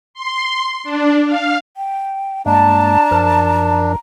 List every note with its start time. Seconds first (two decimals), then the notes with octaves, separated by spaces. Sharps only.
0.14 C6
0.84 D4
1.26 F5
1.77 G5
2.46 G2 G#3 A#3 D4 A5 A#5
3.11 F#2 F3 A#4